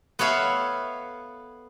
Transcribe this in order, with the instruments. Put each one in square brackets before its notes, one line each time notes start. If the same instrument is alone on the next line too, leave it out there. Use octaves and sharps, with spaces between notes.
[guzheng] B3 A4 C#5 E5 F5